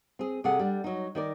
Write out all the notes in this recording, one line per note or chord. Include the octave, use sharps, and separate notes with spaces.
C4 G#4
C3 G#4 A4 F#5
G3 D4
F#3 D#4
D#3 A#4 D5